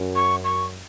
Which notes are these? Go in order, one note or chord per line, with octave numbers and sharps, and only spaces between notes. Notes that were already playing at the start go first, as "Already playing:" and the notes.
Already playing: F#2
C#6
C#6